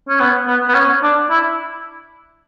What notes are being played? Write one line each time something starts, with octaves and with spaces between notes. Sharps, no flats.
C#4
B3
B3
B3
C#4
D4
E4